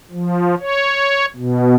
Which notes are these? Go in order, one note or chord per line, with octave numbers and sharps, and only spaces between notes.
F3
C#5
B2